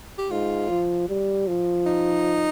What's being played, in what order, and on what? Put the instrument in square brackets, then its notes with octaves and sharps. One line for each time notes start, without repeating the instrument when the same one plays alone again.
[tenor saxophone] G4
[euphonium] G#2 [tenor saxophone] F4
[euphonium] F3
G3
F3
[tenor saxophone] D#4